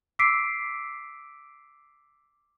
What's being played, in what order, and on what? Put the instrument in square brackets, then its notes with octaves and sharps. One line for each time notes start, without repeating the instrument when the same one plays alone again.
[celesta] D6 E6 B6 C7 D7